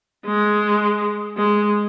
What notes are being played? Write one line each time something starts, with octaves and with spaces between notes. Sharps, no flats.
G#3
G#3